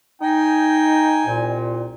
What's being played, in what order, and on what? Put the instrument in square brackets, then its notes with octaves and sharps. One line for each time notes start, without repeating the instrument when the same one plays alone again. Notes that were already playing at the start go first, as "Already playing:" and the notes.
[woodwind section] D#4 [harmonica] G5 G#5
[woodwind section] C2 A#2